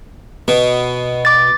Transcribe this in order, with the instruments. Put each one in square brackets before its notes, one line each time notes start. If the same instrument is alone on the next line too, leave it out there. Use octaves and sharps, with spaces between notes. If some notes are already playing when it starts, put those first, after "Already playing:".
[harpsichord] B2 [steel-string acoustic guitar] B3
[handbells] D6 A6